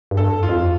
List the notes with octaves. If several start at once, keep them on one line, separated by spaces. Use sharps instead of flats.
G2
A4
F2
F4
F2